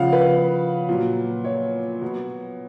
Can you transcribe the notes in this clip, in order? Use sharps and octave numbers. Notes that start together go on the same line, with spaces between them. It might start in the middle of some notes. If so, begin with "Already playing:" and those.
Already playing: C#3 F3 F5 F#5
B4
A#2 F#3
C#5
B2 F#3